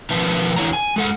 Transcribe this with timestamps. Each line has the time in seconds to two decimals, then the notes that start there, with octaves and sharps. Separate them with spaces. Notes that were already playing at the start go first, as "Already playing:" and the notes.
0.10 B2 D#3 F3 B4 E5 A5
0.56 E2 D3 E4 C#5 F#5 A#5
0.73 G#5
0.96 G#3 A4 F#5